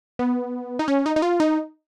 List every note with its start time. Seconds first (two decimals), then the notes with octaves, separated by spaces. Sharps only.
0.19 B3
0.79 D#4
0.88 C#4
1.06 D#4
1.16 D#4
1.22 F4
1.40 D#4